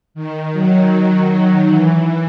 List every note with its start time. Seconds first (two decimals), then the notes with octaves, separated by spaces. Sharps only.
0.14 D#3
0.53 F#3
1.68 E3